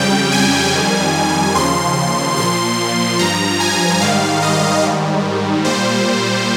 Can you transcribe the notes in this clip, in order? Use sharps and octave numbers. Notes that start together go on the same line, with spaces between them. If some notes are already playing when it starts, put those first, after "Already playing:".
Already playing: F2 C#3 G3 G5
G#5
F2 D#3 G3
D#2 C#3 F3 C6
A#2 F3 C6
G2 F3 A#5
G#5
G#2 D#3 G3 F5
D#5
G#2 D#3 G3
A#2 G3 C5